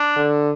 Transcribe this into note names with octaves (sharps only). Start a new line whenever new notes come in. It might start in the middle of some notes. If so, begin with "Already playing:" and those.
Already playing: D4
D3